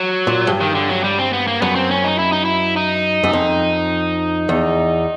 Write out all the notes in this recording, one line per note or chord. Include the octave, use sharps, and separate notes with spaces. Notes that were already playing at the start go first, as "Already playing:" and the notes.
Already playing: F#3
A#2
G2
D#3
D3
F#3
G3
C4
B3
A#3
F#2 B3
C4
C#4
D#4
E4
D#4
E4
D#4
F#2
F2
E2